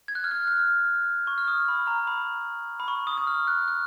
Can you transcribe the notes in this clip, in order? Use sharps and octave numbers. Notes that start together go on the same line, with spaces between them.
G#6
F#6
F6
F#6
F6
C#6
F6
D#6
B5
A#5
B5
B5
C#6
D#6
D#6
F6
F#6
F#6